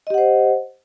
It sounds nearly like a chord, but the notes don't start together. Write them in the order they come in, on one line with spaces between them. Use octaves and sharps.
D#5 G4 F#5 C5